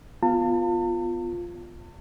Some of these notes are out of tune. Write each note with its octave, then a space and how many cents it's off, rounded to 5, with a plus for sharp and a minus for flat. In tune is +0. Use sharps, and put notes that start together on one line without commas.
B3 +0 F4 +0 A5 +40